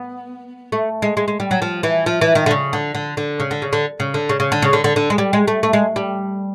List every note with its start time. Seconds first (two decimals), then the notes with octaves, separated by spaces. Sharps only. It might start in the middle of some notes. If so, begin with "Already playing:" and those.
Already playing: B3
0.72 A3
1.02 G#3
1.17 G#3
1.28 G#3
1.40 G3
1.51 F#3
1.62 F3
1.83 E3
2.06 F3
2.21 E3
2.35 D#3
2.46 D3
2.51 C#3
2.73 D3
2.95 D3
3.17 D3
3.40 C#3
3.51 D3
3.62 C#3
3.73 D3
4.00 C#3
4.14 D3
4.29 C#3
4.40 C#3
4.52 D3
4.62 C#3
4.73 D3
4.84 D3
4.96 D3
5.10 G#3
5.18 G3
5.33 G#3
5.48 A3
5.63 A3
5.73 G#3
5.96 G3